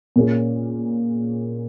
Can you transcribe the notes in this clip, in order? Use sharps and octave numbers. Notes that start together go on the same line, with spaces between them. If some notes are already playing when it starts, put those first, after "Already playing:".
A#2 A#3 C#4 G#4